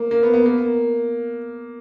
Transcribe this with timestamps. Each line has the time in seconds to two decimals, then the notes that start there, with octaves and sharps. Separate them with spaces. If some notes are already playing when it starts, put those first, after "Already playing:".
Already playing: A#3
0.11 A#3
0.23 B3
0.34 B3
0.46 A#3